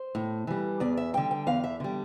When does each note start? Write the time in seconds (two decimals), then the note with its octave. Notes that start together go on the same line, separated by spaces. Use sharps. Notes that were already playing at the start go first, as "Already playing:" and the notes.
Already playing: C5
0.15 A2
0.47 E3 G3
0.80 E2 D5
0.97 E5
1.14 D3 G3 G5
1.31 G5
1.47 E2 F5
1.64 E5
1.80 D3 G3